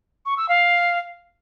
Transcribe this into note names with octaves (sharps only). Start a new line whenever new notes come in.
C#6
E6
F5